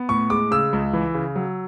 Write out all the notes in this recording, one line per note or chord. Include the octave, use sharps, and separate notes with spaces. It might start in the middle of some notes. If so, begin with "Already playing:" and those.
Already playing: B3
A2 C#6
G#3 D6
C#3 E6
C#2
E3
C#3
F#3